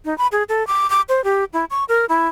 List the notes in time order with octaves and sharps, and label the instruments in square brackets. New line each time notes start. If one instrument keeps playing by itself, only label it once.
[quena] D#4
B5
G#4
A4
D6
D6
C5
G4
E4
C#6
A#4
E4